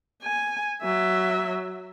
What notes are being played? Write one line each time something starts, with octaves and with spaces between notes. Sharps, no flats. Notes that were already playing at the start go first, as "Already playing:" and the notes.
G#5
F#3 E5